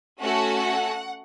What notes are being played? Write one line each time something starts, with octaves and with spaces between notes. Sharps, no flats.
A3 C#4 F#4 A4 F#5